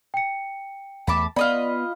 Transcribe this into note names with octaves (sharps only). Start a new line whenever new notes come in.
G5 C#7
E2 A3 A5 B5 D6
B3 F4 D5 D#5 B5